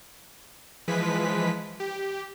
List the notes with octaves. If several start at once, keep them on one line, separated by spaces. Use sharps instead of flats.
E3 F3 G#3 B4 B6
G4